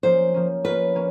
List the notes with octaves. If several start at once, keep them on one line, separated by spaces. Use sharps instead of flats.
F3 A#3 C#4 C5
F3 A#3 C#4
A#3 C#4 F4 B4
A#3 C#4